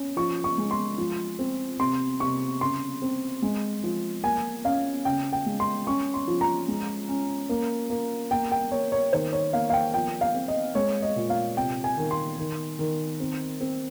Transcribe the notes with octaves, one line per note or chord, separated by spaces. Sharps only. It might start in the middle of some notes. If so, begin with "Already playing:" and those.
Already playing: C#4
F3 C#6
C#6
G#3
C6
F3
C4
C3 C6
C3 C#6
C#3 C6
C4
G#3
F3
A#3 G#5
C#4 F5
C#3 G5
G5
G#3
C6
C#4 C#6
C6
F3
A#5
G#3
C#4
A#3
A#3
A#3 G5
G5
A#3 C#5
C#5
D#3 C5
C#5
A#3 F5
F5
G5
F3 G5
F5
C4
D#5
G#3 C#5
D#5
A#2
F5
C3 G5
G#5
D#3
C6
D#3
D#3
C4
C4